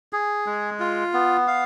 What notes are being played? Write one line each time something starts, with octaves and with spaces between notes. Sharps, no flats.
G#4
G#3
F4
B3
F5